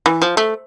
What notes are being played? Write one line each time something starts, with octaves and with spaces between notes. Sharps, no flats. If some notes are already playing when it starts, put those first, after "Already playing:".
E3
F3
A3